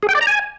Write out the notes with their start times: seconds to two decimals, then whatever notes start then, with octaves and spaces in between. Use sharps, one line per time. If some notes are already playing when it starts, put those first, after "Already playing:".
0.03 G#4
0.09 G5
0.15 D5
0.21 A#5
0.27 G#5